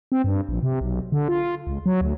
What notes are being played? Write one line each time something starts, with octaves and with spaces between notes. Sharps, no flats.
C4
G2
A#1
C3
B1
D3
F4
C#2
F#3
D2